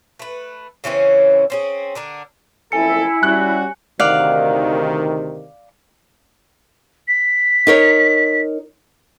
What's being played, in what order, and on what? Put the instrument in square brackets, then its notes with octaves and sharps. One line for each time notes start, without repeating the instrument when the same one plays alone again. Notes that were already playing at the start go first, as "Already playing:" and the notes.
[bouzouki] A3 B4
C#3 E3 C4 C#4
C4 C#4 G#4
D3 D4 A#4
[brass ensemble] F#1 F2 A4 [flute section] E4 [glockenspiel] G#5 C#7
[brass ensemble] G3 C#4 F#4 [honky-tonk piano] F#6
[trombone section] D2 C3 D#3 [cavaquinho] D5 F5 F#5
[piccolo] B6
[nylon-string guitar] D#4 A#4 C#5